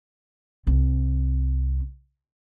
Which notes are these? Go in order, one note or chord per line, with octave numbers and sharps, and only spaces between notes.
C2 C4